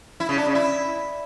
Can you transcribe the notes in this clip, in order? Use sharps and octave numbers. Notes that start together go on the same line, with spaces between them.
E4
C#3
D4
C#3
E4